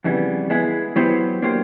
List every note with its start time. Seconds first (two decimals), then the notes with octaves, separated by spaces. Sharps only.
0.04 F2 C#3 E3 G3 B3
0.50 G#3 B3 E4 G#4
0.96 F#3 B3 E4 G4 C5
1.42 F#3 A#3 D4 G4 C5